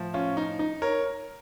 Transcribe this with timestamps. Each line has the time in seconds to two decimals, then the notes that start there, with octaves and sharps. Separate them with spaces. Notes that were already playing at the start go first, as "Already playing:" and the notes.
Already playing: A2 F3
0.14 C#4 F4
0.37 D#4
0.59 D#4
0.82 A#4 C#5